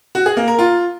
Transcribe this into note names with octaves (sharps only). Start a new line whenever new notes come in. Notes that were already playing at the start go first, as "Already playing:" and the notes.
F#4
G#4
A#3
A#4
F4